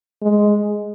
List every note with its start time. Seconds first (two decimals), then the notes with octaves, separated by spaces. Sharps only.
0.22 G#3